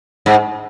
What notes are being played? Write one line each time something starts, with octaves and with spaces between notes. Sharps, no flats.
G#2